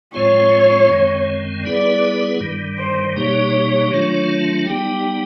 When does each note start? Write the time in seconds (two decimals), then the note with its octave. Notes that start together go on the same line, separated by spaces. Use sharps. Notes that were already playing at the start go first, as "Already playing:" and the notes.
0.14 A2 F3 G#3 C4 F4 C#5
0.90 F#2 D#3 G#3 C4
1.65 G3 B3 E4 G#4 B4 D5
2.40 G2 D#3 G3
2.78 C5
3.16 B2 G3 A#3 D#4 G4 C#5
3.91 D#3 F#3 A3 D4 F4
4.67 G3 B3 D#4 G4